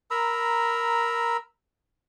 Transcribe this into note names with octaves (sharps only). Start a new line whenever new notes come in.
A#4 A#5 B5 E6